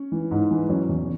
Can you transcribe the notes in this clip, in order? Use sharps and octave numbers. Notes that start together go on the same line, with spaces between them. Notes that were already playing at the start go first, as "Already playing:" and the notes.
Already playing: C#4
E3
G#2
E3
F#3 C#4
E2